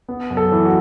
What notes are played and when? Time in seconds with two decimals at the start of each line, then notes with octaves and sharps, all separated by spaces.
0.08 B3
0.30 F#2
0.37 A4
0.52 E3
0.65 F#4